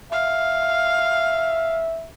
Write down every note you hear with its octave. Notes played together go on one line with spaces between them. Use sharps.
E5 F5